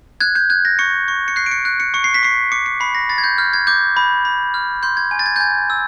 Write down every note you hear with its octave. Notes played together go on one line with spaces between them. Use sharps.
F#6 G#6
G6
F#6 G#6
A#6
C#6 C#7
C#6
C#7
F#6 C7
D7
C#7
F#6
C#7
C#6 C#7
C7
B6
C#6 C7
D6 C#7
C#7
B5 C7
A#6
B5 A6
G#6
G6
F6 G6
G#6
D6 G6
B5
B5
F6
C6 G6
G#6
G#5
A6
G#6
G6
G#5 G#6
E6